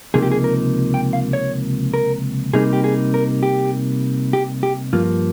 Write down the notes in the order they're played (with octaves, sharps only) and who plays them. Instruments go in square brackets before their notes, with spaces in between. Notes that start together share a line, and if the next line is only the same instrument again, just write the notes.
[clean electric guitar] C#2 C3 F3 A#3 D#4 G#4
G4
G#4
A#4
G5
F5
C#5
A#4
C3 G3 A#3 D#4 G#4
G4
G#4
A#4
G4
G4
G4
G2 F3 A#3 F4